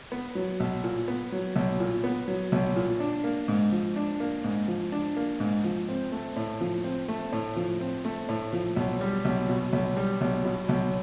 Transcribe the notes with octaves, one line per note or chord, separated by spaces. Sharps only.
B3
F#3
B1
A#2
B3
F#3
B1
A#2
B3
F#3
B1
A#2
D4
A#3
G#2
F3
D4
A#3
G#2
F3
D4
A#3
G#2
F3
C4
A3
A2
F3
C4
A3
A2
F3
C4
A3
A2
F3
B1
G3
B1
B2
B1
G3
B1
B2
B1